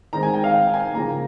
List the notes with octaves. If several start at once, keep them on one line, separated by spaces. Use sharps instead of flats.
D#3 G#3 C4 A#5
G#5
G5
F5
G5
G#5
C#3 F3 A#3 A#5